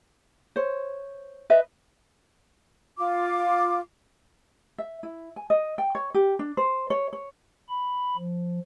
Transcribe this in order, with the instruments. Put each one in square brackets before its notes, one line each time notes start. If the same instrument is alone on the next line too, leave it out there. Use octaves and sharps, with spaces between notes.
[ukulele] C5 C#5
B4 D#5 E5
[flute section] F4 D6
[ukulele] E5
E4
G#5
D#5
G5
C#5
G4
D4
C5
C#5
C#5
[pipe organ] B5
F3